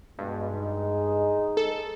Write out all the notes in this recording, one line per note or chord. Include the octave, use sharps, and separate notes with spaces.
G2 B2 G#3
D#4
A4